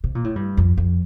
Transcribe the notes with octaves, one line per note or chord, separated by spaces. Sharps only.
C3
A#2
A2
G2
F2
F2